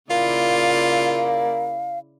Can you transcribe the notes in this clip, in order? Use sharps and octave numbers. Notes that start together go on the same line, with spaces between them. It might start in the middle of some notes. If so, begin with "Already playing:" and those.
C#3 A#3 E4 F4 D5 F5